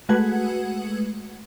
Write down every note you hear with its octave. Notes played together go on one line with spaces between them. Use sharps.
G#3 A3 F#4 B4 F#5 G#6